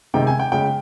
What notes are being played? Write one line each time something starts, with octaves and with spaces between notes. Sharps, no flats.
C3 D#3 G#3 G5
G#5
G5
C#3 G#3 G5